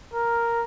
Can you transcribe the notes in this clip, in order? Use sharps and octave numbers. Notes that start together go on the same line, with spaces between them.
A#4